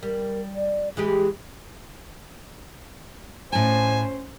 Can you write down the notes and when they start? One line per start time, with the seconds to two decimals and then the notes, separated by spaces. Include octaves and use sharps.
0.03 G3 A#4
0.56 D5
0.97 E3 G#3 G4 G#4
3.53 A2 C#4 C5 G#5 A5